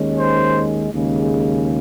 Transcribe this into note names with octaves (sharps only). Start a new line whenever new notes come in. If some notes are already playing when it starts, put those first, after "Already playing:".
Already playing: D#2 D#3 G#3 C#4
C5
D#2 C#3 G#3